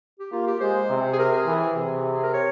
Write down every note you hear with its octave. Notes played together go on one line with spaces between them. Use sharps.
G4
A#3 F4
G4
G#3 C5
C3
G#4
A#4
G#4
E3
C3
G#4
A#4
C#5